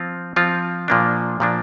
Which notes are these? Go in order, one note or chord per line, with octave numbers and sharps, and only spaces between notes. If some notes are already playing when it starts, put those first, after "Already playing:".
Already playing: F3 C4 F4
F3 C4 F4
A#2 F3 A#3 D4
A#2 F3 A#3 D4